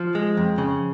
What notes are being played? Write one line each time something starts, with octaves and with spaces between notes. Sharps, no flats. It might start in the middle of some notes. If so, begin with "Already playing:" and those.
Already playing: F3
G#3
F2
C#3